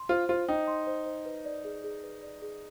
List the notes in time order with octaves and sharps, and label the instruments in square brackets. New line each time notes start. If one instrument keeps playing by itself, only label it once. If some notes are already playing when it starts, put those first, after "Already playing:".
Already playing: [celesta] C6
[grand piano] F4 [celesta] C5
[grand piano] F4 [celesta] C5
[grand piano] D#4 [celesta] G5
[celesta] C6
C5
C5
B4
D5
G#4
G#4
B4
D5
G#4